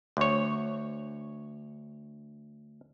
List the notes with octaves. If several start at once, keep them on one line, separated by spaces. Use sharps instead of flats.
D2 C#5